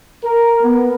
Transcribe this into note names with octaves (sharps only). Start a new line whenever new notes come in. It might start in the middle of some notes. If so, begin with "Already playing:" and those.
A#4
B3